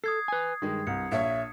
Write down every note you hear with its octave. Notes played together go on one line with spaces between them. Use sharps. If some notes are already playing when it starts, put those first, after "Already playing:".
A4 D#6 G#6 C7
B4 G#5
G2 D#3 G#3
C2 C#7
A#1 C#5 E5